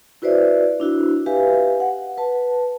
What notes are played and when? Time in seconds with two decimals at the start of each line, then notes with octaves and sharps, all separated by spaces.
0.22 E4 F#4 B4 C5 D5 E5
0.80 D4 E4 F#4
1.26 G4 B4 E5 F5 G#5
1.80 F#5
2.18 B4 A5